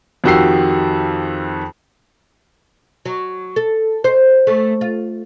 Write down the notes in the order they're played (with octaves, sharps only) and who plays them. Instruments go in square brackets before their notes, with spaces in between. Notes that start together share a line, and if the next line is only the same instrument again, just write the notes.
[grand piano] F2 D#3 F#4 G4 E6 C7
[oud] F#3
A4
C5
A3
F4